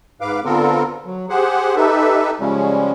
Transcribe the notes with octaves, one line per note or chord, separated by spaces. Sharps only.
G#2 B4 F5 D6
D3 B3 C4 F4 A4 A#4
F#3
G4 G#4 C5 F#5
D#4 G4 A4 B4 E5
C#3 F3 G3 G#3 C#4